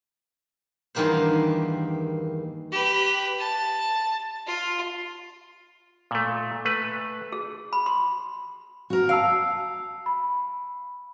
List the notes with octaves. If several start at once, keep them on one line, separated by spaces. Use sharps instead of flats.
E2 G2 D#3 A#3 G4 C5
G4 B4
A5
F4
A#2 A3
A3 B4
G#4
B5
C6
F#4 A#4
F5 A5 E6 D7
B5